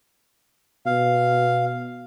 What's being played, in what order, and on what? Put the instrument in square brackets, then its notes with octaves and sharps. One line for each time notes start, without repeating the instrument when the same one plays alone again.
[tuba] B2 [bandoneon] F5